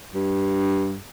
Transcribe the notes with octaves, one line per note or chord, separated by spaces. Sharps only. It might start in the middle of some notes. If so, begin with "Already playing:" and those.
G2